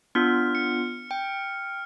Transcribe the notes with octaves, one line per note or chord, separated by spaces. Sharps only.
B3 D4 F4 F6
C#7
G5